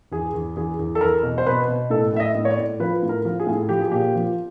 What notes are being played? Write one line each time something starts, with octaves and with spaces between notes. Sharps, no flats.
E2 G#4
E2
E2 G#4
E2
A4
E2 A#4
B2
C5
B2 B4
B2
A2 A4
A2 E5
D#5
A2
C#5
D5
A2
F3 B4
A2
A#4
F3
G#4
A2
F3 G4
G#4
A#2 G4
F3